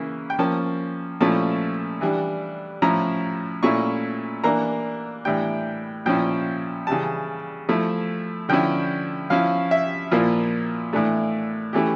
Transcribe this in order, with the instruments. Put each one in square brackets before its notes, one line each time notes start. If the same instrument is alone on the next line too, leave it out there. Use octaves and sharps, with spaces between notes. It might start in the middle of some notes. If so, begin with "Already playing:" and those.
Already playing: [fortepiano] C#3 E3 A#3 C#4 E4
G5
F3 A#3 C#4 A5
A#2 F3 A3 C#4 E4 A5
E3 G3 D4
A2 F3 C#4 E4 A#5
A#2 A3 C#4 E4 C#6
E3 A#3 D4 A#5
A2 E3 G3 D4 G5
A#2 F3 C#4 E4 G5
C#3 E3 G3 A5
F3 A3 E4
D3 F3 C#4 E4 G5
F3 C#4 E4 F5
E5
A#2 F3 A#3 E4 F4
A2 E3 A3 D4
E3 A3 C#4 E4 G4